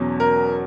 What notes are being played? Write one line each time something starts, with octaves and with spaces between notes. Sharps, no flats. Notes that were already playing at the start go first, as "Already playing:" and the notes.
Already playing: E2 B2 F#3 C#4
A#4